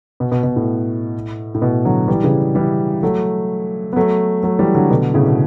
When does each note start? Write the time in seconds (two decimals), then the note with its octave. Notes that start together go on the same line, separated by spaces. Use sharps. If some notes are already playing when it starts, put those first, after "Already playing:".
0.20 B2
0.32 B2
0.43 B2
0.56 A2
1.55 A2
1.62 B2
1.85 D3 F#3
2.08 E3 G3
2.24 C#3 E3
2.55 E3 G3
3.03 F#3 A3
3.93 B3
3.96 F#3 A3
4.43 F#3 A3
4.59 E3 G3
4.75 D3 F#3
4.90 B2 D3
5.14 A2 C#3
5.26 B2